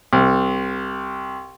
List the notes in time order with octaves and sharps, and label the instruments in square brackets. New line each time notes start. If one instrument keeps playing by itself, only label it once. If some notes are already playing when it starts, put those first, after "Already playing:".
[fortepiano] C2